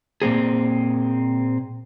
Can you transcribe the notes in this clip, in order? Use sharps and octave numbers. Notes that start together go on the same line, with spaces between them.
A#2 A#3 C4 G#4